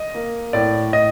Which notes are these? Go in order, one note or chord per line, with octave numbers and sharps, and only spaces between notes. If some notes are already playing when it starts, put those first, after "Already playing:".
Already playing: D#5
A#3
A2 D5
A2 D#5